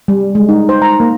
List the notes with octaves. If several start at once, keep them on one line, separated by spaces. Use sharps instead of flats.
G3
G#3
D#4
C5
A#5
A#3